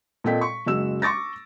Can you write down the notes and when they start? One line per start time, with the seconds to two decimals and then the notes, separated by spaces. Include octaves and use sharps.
0.24 A#2 C4 A4 D#5 G5 B6
0.41 C#6
0.66 F#1 G#3 F#4 E6 E7
1.02 C#6 D6 A6 A#6